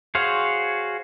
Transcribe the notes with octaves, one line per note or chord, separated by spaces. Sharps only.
F#4 G#4 C5 C#5 F5